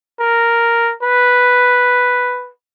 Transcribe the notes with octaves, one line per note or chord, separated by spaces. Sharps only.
A#4
B4